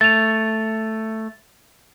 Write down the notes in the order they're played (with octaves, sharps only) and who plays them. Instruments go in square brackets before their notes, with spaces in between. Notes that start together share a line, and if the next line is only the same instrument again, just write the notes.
[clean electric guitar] A3 [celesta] A6 F7